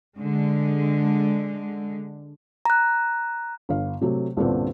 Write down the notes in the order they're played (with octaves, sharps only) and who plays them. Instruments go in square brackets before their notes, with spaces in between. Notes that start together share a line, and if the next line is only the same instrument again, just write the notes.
[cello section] D3 G#3
[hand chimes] A#5 F#6
[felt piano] G1 F5
C3 F#3 A3
C2 G2 A#2 D3 B3 C4